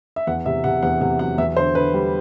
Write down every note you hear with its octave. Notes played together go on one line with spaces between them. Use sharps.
E5
E2 F#5
C3 E5
C3 F#5
E2 F#5
C3 F#5
F#3 F#5
E2 E5
D3 C5
D3 B4
G3